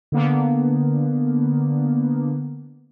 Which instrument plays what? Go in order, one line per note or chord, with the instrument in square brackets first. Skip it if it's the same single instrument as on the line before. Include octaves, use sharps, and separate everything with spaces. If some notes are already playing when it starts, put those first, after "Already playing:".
[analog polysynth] D3 A#3 B3